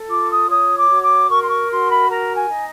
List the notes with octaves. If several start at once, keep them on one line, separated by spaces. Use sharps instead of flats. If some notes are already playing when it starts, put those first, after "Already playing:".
Already playing: A4
F4 D6
D#6
C#5 D#6
D6
F#4
D6
A#4 C#6
C6
C#6
F#4 C6
B5
A#4 A#5
G#5
D#4